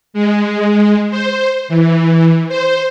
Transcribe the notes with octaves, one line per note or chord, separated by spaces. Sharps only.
G#3
C5
E3
C5